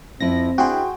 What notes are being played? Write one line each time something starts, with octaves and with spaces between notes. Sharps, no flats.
F2 F3 C4 E4 A#6
D4 E4 F#4 G#4 C5 G5